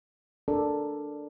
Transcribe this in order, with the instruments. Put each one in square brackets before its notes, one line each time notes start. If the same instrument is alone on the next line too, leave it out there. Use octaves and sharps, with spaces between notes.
[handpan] D4 A4 A#4 D5